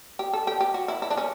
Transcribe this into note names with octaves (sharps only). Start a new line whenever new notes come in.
G4
A4
G4
G4
F#4
E4
E4
D4
C#4